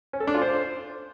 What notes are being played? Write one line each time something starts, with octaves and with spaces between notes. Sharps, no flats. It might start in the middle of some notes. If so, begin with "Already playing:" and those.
C#4
A4
D4
F4
C5